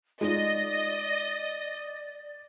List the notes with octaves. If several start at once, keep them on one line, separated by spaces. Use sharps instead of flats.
G#3 D#4 F4 D5 D#5